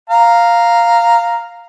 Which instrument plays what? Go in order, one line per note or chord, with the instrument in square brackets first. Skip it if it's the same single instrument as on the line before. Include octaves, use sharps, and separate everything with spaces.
[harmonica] F5 A#5